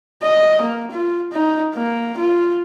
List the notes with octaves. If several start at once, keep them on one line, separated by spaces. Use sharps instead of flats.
D#5
A#3
F4
D#4
A#3
F4